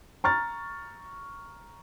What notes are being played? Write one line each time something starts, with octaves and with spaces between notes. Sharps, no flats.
A#5 C#6 F6 A6